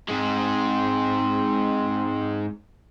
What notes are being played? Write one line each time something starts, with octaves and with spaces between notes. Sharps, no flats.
G#2 G#3 C4